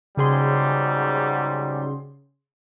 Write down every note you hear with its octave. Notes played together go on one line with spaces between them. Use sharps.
G#2 C#3 F#3 G3 G#4 C6